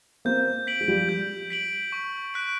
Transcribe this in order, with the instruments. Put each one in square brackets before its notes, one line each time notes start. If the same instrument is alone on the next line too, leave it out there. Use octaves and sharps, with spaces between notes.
[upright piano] A#3 C4 [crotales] G6
[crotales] B6 D7 F#7
[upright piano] G#3
F3 G3
[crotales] G6
B6 D7 F#7
C#6
F#6 B6 D7